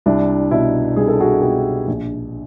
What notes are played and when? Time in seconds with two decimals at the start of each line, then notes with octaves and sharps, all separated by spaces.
0.06 C2 D4 E4
0.51 B2 D4 E4
0.96 C2 G#4
1.08 A4
1.20 F#4 G#4
1.42 B2 G4 A4
1.88 A#1